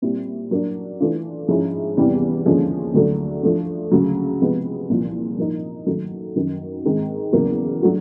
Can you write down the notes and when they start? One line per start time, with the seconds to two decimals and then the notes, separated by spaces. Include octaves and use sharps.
0.02 A#2 G3 C4 E4 G4
0.51 F#3 A#3 D4
1.00 E3 A3 D4 F4
1.48 G#2 F3 G#3 C#4 E4
1.97 E2 C3 E3 G3 B3
2.46 D#2 D3 F3 G#3 C#4
2.94 D2 D3 F#3 A3 D4
3.43 F3 A3 D4
3.91 D2 C#3 F#3
4.40 C3 F3 G#3 B3
4.89 C2 A#2 F3
5.38 F3 A#3 D#4
5.86 D#3 F#3 A3
6.36 F#2 D#3 F#3
6.84 G#2 D#3 G#3 C4
7.32 E2 C#3 F#3 A#3
7.82 F#3 A3 D4 F#4